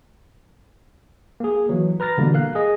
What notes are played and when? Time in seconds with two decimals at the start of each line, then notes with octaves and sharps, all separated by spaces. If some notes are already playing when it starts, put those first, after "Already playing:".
1.40 A#3 G#4
1.69 E3 F#3
2.00 B4 A#5 F6 A6 A#6
2.18 B2 D3 E3 G3 A#3
2.34 A#4 F5 F#6
2.55 G#4 D#5